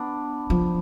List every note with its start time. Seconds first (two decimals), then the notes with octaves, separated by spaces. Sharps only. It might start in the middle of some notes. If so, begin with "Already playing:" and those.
Already playing: B3 D4
0.50 F3